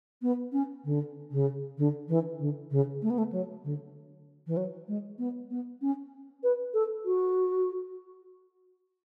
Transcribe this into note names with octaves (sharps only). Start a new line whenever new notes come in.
B3
C#4
D3
C#3
D3
E3
D3
C#3
A3
B3
A3
F#3
D3
E3
F#3
G#3
B3
B3
C#4
B4
A4
F#4